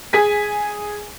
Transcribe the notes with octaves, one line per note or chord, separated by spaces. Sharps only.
G#4 G#5 B6